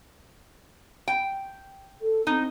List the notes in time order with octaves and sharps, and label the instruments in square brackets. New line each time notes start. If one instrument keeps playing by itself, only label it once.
[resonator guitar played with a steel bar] G5
[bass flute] A4
[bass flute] C4 [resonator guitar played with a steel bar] D#4